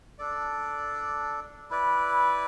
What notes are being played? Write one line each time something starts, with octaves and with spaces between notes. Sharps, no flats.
D4 A4 D5
E4 B4 D5